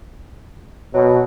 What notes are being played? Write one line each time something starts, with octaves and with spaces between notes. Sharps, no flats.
B2 F#3